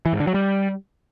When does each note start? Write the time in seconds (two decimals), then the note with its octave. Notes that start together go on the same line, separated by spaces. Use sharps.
0.06 E3
0.13 G#2
0.20 D3
0.27 F#3
0.34 G3